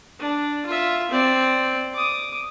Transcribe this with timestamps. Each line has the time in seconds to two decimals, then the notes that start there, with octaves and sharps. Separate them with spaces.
0.20 D4
0.66 F4 E5
1.11 C4 D5
1.94 D6 D#6